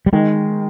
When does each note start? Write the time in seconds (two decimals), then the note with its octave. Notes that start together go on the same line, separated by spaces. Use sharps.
0.06 G3
0.13 D#3 G#3